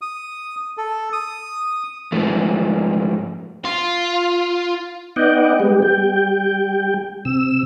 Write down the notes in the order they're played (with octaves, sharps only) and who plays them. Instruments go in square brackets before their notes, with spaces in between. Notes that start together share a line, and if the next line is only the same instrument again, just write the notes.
[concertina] D#6
A4
D#6
[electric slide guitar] G#2 F3 A3
[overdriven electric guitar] F4
[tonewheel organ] B3 D#4 D5 D#5 F#5 G5
G3 G#3 B3 G4
G3 G5
C3 E6